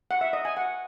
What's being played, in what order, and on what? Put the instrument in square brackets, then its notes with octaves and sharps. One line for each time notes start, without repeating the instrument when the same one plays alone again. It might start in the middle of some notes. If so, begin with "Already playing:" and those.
[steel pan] F#5
E5
D#5
G#5
F#5